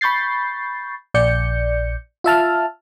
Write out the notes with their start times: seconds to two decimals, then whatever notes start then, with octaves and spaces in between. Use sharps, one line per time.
0.01 B5 C#6 G6 A6 C7
1.14 A#1 D5 G6 C#7
2.24 F4 E5 A5 F6